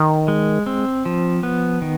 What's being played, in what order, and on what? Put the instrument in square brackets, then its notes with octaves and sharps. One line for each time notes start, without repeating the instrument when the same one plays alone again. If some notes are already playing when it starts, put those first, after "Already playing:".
Already playing: [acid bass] D#3
[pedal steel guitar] G#3
C4
F3
B3
D#3